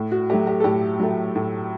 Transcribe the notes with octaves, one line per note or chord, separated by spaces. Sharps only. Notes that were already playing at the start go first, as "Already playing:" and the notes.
Already playing: A2
F#4
F#3 A3 G4
G4
A4
A2 G4
F#3 A3
A2